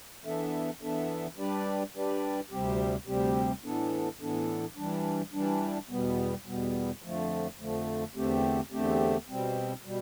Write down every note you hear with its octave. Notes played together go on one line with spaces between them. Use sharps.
E3 B3 D4 A4 E5
E3 B3 D4 A4 E5
G3 D4 G4 B4 D5
G3 D4 G4 B4 D5
D2 C3 G3 C4 G4
D2 C3 G3 C4 G4
A2 E3 B3 D4 A4
A2 E3 B3 D4 A4
E3 G3 D4
E3 G3 D4
E2 B2 G3 B3
E2 B2 G3 B3
F2 D3 F3 A3
F2 D3 F3 A3
E2 D3 A3 C4 G4
E2 D3 A3 C4 G4
B2 G3 C4
B2 G3